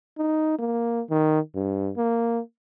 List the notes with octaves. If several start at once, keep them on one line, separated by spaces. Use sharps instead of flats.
D#4
A#3
D#3
G2
A#3